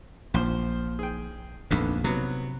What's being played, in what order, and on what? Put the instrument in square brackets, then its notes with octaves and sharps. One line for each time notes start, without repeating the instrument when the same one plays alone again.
[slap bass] A#1 [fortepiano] F3 C5
[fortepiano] G#4 G5
[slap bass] A#1 F2 G#2 [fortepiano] D3 B3
[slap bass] C3 [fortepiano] F#3 B3